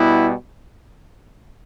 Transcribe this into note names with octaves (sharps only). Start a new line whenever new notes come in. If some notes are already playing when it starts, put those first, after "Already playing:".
Already playing: B2 G3 B3 E4